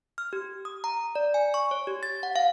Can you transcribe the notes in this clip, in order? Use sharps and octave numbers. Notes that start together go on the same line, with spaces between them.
F6
G4
D#6
A#5
D5
G#5
C#6
C#5
G4
A6
F#5
F5